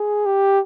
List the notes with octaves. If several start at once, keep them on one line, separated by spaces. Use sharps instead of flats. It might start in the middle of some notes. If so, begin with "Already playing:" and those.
Already playing: G#4
G4